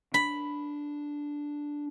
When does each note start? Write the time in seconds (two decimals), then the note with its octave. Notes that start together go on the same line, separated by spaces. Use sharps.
0.14 D4 B5